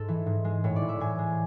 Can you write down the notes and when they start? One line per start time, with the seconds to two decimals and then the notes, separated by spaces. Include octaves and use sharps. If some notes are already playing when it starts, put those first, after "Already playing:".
Already playing: G#2 A4
0.08 E3
0.26 G#2
0.44 G#3
0.64 A2 C#5
0.76 D5
0.82 E3
0.89 E5
1.00 A2 G#5
1.19 G#3